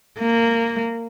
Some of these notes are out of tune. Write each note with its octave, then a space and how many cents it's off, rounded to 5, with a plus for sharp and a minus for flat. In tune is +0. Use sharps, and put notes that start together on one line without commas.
A#3 -15